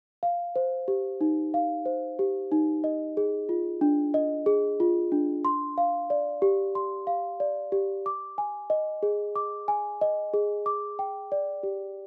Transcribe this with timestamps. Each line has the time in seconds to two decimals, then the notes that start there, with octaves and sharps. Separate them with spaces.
0.23 F5
0.56 C5
0.88 G4
1.21 D#4
1.54 F5
1.86 C5
2.19 G4
2.52 D#4
2.84 D#5
3.17 G#4
3.49 F4
3.81 D4
4.14 D#5
4.46 G#4
4.80 F4
5.12 D4
5.45 C6
5.78 F5
6.10 D5
6.42 G4
6.75 C6
7.07 F5
7.40 D5
7.72 G4
8.06 D6
8.38 G#5
8.70 D#5
9.03 G#4
9.36 D6
9.68 G#5
10.01 D#5
10.34 G#4
10.66 D6
10.99 G5
11.32 D5
11.63 G4